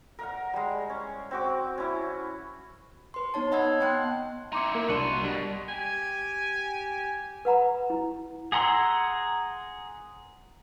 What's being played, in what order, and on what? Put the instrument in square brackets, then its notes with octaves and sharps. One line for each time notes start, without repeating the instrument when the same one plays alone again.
[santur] A#4 F5 F#5
G3 G#3
C#4
C4 F#4 D6
C#4 E4 D6
[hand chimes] B4 C6
B3 D#4 C#5 A5
C#5 D#5 F#5 B5 E6 G#6
B3 G5 A5 C6 F#6
[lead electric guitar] D#4 E4 [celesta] C6 D6 C#7
[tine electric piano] A#3 [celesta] A#4
[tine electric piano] C2 D4 [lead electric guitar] F#4 C6 [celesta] C#7 D#7 E7
[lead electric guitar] B2 [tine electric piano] G3
[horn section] G4 G#5
[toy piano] B4 F#5 A#5 B5
E4
[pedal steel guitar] G#4 F#5 A#5 C6 E6